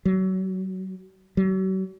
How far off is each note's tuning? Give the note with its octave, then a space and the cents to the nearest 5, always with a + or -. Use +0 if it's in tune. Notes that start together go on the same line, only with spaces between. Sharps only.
F#3 +30
F#3 +40